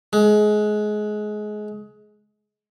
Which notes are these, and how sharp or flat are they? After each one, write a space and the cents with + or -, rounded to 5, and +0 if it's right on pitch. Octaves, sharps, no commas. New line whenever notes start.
G#3 +25